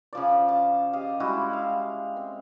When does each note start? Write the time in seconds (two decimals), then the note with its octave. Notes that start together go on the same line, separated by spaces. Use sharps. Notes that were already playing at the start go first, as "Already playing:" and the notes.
0.13 C#3 F3 D5
0.49 A5
0.93 G4 D#5 F5
1.20 G3 G#3 E4 F#4
1.53 F5
2.17 C4